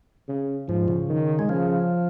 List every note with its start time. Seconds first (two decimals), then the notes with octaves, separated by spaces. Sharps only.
0.28 C#3
0.68 G#2 F3
0.88 C#3
1.08 D#3
1.39 G#3
1.49 C#3 F3